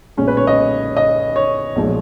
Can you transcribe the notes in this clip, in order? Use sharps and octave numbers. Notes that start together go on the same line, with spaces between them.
B1 A#2 G#3 C#4
B4
C#5
D#5
D#5
C#5
B1 A#2 F3 G#3